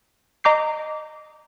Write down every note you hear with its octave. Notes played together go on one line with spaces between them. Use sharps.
D#5 A#5 D6 G6 C7